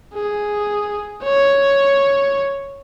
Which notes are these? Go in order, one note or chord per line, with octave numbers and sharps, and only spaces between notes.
G#4
C#5